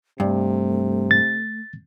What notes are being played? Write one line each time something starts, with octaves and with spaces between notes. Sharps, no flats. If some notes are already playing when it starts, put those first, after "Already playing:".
G2 C3 A3
A6